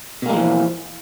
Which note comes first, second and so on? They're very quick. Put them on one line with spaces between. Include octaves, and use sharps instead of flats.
B2 A#3 G#3 F3 E3